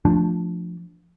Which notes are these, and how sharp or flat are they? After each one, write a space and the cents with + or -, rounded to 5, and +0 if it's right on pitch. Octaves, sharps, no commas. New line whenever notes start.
F3 +0 A3 +0 D4 +0